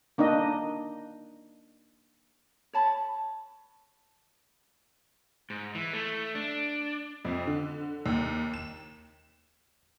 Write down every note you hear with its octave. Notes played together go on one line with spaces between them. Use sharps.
A#3 D4 D#4 D#5
C#5 A5 B5
G#2
E3
A3
D4
F2
D3
D#2
E7